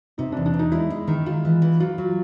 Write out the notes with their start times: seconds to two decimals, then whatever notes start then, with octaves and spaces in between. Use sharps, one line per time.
0.18 C3 D#4
0.32 E2 D4
0.46 D4
0.54 E2
0.59 D#4
0.72 G#3 E4
0.90 G#3
1.08 D#3
1.26 G#3 F4
1.45 E3
1.62 E3
1.80 F#3 F4
1.98 F#3